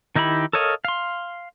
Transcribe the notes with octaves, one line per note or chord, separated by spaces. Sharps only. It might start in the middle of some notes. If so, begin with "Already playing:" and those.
D#3 D#4 E4 G4 B5
A4 A#4 C#5 D#5 F5
F5 C6